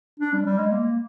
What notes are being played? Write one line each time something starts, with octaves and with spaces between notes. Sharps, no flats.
D4
G3
G3
G#3
A#3